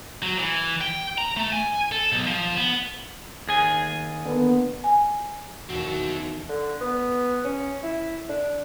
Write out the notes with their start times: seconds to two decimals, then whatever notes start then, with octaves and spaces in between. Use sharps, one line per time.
0.22 F#3
0.38 E3
0.81 G5
1.18 A#5
1.37 A3
1.53 G#5
1.92 A4
2.12 B1
2.27 F3
2.57 B3
3.47 D#2 G#4 G#5
4.26 D3 A#3 B3
4.84 G#5
5.69 E1 D#2 C4 F#4 A4
6.49 D3
6.81 B3
7.45 C#4
7.84 E4
8.29 D4